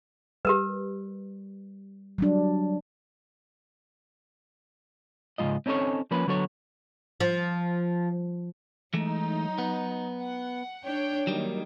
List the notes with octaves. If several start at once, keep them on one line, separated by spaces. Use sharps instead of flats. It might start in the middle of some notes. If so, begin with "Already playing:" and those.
G3 G4 A#4 B4
F#3 G3 D4
C#2 G#2 C3 G#3 F4 D#5
C4 C#4 D#4 A4 C#5
F3 A#3 C#4 B4
D3 F#3 B3 A4 C#5
F3
E3 F#3 G#3 A3 D#4
B3
F#5
D4 C#5 G5
D#3 F#3 G3 A#3